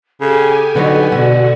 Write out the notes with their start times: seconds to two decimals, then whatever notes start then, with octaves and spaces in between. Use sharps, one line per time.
0.21 C#3 G4 A4 G#5
0.75 D3 F#3 B3 D#4
1.12 B2 D3 F#4